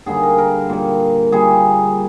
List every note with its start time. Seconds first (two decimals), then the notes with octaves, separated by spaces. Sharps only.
0.06 D3 G3 A#3 G#4
0.23 A#4
0.38 A#4
0.69 A#2 G3 A#3
1.32 A#2 G3 A#3 G#4